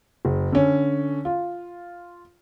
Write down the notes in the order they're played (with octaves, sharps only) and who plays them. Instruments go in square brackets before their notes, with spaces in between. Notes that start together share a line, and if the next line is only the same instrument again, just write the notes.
[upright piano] F#1
D3 C#4
F4